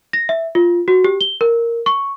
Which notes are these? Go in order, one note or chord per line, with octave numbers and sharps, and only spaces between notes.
A#6
E5
F4
F#4
G4
G7
A#4
C#6